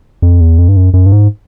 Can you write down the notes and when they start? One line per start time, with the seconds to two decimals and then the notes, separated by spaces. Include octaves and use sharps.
0.22 F2
0.41 E2
0.58 F2
0.68 G2
0.76 F#2
0.94 F#2
1.06 G2
1.12 G#2